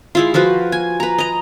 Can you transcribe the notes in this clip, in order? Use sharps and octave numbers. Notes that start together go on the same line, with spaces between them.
G#3 E4 F4
F3 F4 F#4 B4
G#5
B4 A#5
D#5 A#5